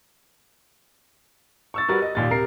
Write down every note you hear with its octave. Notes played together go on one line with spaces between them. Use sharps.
C#6 E6 A6
G3 F#4 A#4 B4 A6
D#5
D#2 A#2 A6
C3 A#4 C7